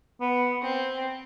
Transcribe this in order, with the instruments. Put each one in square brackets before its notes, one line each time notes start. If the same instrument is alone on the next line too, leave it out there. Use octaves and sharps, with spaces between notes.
[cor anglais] B3
[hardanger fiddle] C4